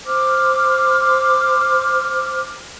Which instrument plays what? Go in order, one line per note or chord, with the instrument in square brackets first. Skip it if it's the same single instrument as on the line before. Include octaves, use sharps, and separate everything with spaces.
[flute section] C5 D6 E6 F6